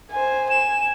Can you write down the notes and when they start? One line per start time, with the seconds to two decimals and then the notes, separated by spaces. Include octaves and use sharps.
0.11 C5 G#5
0.50 G#5 E7